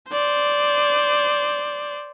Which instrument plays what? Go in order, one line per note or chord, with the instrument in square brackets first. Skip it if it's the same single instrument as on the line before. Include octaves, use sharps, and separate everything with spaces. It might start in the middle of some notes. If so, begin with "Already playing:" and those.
[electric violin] C5 D5